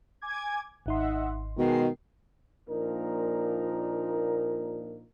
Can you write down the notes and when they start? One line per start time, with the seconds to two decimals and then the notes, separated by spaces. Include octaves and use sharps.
0.22 G#5 D6 G#6
0.86 G#1 D#4 D#5 E5 F#5 C6
1.58 B2 D#3 G#3 C7
2.69 A#2 F3 A#3 D4 D#4 A#4